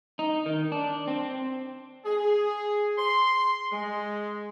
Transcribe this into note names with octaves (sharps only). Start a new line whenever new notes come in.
D#4
D#3
D4
C4
G#4
C6
G#3